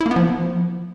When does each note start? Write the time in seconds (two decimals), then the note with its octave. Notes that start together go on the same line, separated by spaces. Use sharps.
0.01 E4
0.06 A#3
0.11 B3
0.16 F3